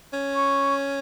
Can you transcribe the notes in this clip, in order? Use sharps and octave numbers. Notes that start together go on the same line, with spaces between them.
C#4
C#6